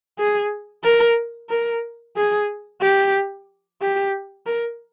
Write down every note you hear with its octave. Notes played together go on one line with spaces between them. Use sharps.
G#4
A#4
A#4
G#4
G4
G4
A#4